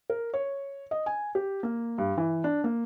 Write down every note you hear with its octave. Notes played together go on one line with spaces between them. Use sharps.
A#4
C#5
D#5
G#5
G4
A#3
G2
E3
D4
A#3